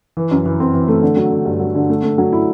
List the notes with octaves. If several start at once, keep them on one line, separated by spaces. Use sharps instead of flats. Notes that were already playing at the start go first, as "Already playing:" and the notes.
E3
F#2
E3
C4
E3
A3
D3
F#3
D3
G2
F#3
D3
A3
A3
F#3
E4